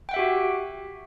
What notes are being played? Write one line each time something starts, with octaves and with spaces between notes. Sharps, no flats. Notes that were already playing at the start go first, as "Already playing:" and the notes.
F#4 G4 E5 F#5 G5